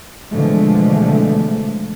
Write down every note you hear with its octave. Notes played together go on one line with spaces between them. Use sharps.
B2 D3 E3 F3 G#3 A3